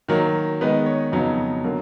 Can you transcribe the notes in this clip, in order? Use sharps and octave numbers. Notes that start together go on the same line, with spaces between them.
D#3 F#3 A#3
D#3 G#3 B3 D#4 B4
C#5
F2 C#3 F#3 B3 D#4
D3 F#3 A#3